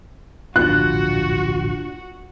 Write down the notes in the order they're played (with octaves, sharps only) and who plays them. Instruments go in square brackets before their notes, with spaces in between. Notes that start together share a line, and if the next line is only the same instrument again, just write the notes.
[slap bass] D1 A#1 G2 [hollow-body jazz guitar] D4 F4 [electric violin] F#4 [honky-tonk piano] F#6